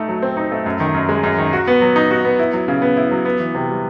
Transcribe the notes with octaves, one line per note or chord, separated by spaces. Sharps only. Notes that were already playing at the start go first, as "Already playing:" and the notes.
Already playing: A3 D#4
F#3
C4
D#4
A3
F#2
D#3
F#2
G#3
F#2
D#3
F#4
B3
F#3
D#4
F#4
B3
E4
F#3
C#3
B3
E4
F#3
B3
E3
C3
G3